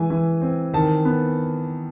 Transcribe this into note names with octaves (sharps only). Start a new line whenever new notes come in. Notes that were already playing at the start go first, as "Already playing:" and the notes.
Already playing: E3 G#3 G#5
E3
C4
D#3 A5
B3